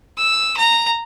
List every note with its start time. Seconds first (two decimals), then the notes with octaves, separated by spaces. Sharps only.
0.18 E6
0.57 A#5